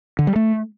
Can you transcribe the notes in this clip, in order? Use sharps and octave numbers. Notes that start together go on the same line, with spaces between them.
D3
G3
A3